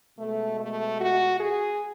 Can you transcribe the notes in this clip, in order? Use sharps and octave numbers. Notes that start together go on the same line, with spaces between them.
B2 G#3 A3
A3
F#4
G#4